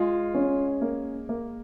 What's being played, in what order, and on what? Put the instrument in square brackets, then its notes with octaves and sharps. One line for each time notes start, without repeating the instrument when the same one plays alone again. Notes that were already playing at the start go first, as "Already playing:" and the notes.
Already playing: [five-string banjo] G#3 [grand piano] F4
[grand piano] C#4
A#3
A#3